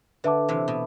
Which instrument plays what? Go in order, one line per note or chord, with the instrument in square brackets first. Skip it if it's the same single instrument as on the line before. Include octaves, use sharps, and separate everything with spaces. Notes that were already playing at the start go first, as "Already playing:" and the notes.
[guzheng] D3 [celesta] B4 E5 A5 D6
[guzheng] C3 E3
B2